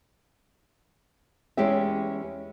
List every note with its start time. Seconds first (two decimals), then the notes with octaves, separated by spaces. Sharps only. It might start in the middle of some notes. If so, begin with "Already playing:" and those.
1.57 E2 G#3 C#4 E4 G4 E5